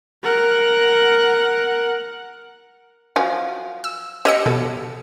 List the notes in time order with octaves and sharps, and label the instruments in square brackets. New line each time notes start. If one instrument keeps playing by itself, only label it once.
[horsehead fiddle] A#4 F#5
[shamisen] F3 F#3 G#5
[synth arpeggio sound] E6
[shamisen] G4 C#5 [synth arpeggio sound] D#5 E6 C#7
[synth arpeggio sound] B2 [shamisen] A4